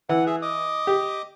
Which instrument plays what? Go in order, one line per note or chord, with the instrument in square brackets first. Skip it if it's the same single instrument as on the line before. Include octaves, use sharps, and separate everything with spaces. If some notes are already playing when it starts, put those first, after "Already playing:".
[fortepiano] E3 [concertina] F#5
[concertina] G#4 E5
D#5 D6 D#6
[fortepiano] G4